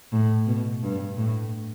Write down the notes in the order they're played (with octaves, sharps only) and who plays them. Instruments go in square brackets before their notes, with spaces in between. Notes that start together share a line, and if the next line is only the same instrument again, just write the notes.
[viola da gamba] A2
B2
G2
A2